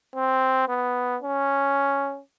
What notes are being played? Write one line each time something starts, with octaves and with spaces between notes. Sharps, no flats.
C4
B3
C#4